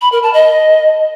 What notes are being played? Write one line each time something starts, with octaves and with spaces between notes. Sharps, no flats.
B5
A#4
A5
D#5